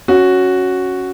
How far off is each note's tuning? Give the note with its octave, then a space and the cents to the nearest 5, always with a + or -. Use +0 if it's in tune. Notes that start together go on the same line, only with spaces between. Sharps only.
C#4 +0 F#4 +0